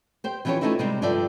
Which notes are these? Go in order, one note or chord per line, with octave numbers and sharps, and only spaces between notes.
G4 C5 G5
E3 F3 C#4 E4 G4 C#5
F3 A3 C#4 D#4 E4 G4
C3 G3 G#3 C4 D#4
G2 D3 F3 D5 E5 G5